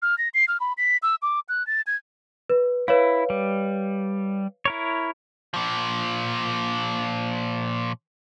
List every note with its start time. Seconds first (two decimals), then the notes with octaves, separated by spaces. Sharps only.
0.02 F6
0.18 A#6
0.34 C7
0.48 F6
0.60 B5
0.78 B6
1.03 E6
1.22 D6
1.49 F#6
1.67 A6
1.87 G#6
2.50 B4
2.88 E4 B4 C#5 F5
3.30 G3
4.65 E4 A#4 C#5
5.54 A#2 F3